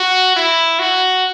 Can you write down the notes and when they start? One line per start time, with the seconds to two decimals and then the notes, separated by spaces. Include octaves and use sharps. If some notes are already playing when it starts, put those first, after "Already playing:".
Already playing: F#4
0.36 E4
0.79 F#4